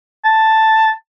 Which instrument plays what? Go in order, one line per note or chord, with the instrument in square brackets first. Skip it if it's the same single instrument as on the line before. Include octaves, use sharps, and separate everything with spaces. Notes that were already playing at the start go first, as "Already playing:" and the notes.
[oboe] A5